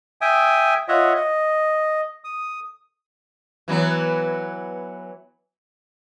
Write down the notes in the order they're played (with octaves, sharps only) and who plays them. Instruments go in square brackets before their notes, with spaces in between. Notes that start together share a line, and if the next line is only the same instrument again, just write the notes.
[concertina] E5 G5 G#5 D#6
F4 C#5 D#5 E5 F#5
D#5
D#6
[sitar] E3 F#3 B3